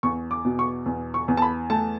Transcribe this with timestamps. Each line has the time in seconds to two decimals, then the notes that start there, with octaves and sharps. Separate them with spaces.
0.03 E2 C#6
0.31 D6
0.45 B2
0.59 C#6
0.86 E2
1.14 C#6
1.28 E2
1.37 A5
1.42 B5
1.70 A3 A5